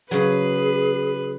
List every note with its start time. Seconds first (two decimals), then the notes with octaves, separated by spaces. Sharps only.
0.11 C#3 F#3 G#4 B4